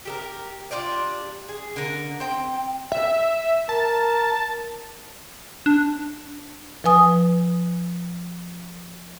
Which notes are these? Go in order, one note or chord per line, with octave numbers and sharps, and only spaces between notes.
G4 A4 A#4
D4 F4 G4 D5
G#4
D3 A#4
C4 G5
E5
A#4 A5
D4
F3 B4 G#5 D#6